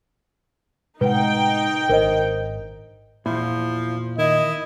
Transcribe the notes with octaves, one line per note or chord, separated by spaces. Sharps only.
A2 C3 G#3 D#4 B4 F#5 G5
G#1 D4 A#4 C5 D#5
E2 A#2 F3 E4
D#3 E4 D#5